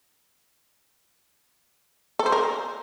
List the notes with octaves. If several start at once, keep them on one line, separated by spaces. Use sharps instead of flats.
A4
C5
A#4